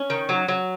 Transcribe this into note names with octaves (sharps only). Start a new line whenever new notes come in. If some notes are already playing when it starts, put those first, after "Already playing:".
Already playing: C#4
D#3
F#3
F#3